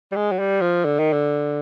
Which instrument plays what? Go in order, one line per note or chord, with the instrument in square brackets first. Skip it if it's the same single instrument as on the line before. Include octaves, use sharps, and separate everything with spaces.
[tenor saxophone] G3
G#3
F#3
G3
F3
D3
D#3
D3